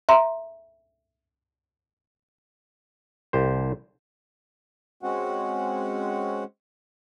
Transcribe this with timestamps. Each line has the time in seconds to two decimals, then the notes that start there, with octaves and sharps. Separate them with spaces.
0.09 E5 A#5 C6
3.33 C2 G4 C5
5.03 G#3 C4 C#4 F#4 F#5